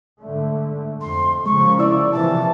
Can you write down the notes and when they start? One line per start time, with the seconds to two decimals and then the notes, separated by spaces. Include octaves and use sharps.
0.22 G#2 D3 A3
1.01 F2 C6
1.46 C#3 F3 G#3 A#3 C#6
1.79 E4 D5 E6
2.12 C3 E3 F3 A5